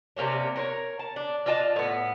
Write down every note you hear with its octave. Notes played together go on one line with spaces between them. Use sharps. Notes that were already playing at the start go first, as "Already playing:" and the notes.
C3 A#3 C#4 D4
A#4 C5 C#5
A5
D4
D4 F4 D#5 A5
A2 B3